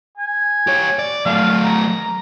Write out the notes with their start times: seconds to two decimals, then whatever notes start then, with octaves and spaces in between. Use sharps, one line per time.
0.18 G#5
0.67 G4 C#5
0.99 D5
1.26 F#3 A3 F5
1.64 A#5